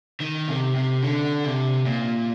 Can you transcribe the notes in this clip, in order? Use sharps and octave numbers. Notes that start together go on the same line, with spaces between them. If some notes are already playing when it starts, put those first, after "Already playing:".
D#3
C3
C3
D3
C3
A#2